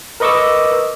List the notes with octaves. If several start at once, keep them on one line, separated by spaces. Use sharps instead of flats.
A#4 B4 D#5 C#6 D6 E6